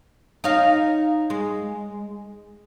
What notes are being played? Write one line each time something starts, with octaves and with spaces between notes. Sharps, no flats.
D#4 C#5 F5
G#3